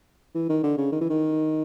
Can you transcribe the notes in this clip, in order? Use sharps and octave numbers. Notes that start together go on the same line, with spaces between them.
E3
D#3
D3
C#3
D#3
E3
D#3